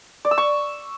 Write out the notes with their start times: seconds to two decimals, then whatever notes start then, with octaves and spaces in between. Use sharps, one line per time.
0.25 D5
0.31 E6
0.38 C#6